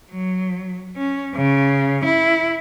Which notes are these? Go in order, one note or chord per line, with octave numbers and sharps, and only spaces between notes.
F#3
C#4
C#3
E4